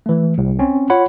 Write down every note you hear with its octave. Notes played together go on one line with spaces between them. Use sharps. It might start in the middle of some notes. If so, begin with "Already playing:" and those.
E3 A3
C2
C4 C#4
F4 C#5 F#5 B5